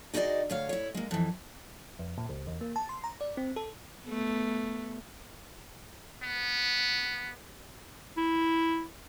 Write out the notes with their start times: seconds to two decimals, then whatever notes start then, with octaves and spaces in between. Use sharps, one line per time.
0.14 D#4 F#4 G#4 C5 D5 D#5
0.50 D2 C#5 F5
0.69 E4 C#5
0.94 G#3 A#3
1.11 F2 E3
1.99 F2
2.18 A#2
2.29 C#2
2.47 E2
2.61 A#3
2.76 A5
2.89 C6
3.04 A#5
3.21 D5
3.37 C4
3.56 A4
4.05 A3 B3
6.23 B3
8.17 E4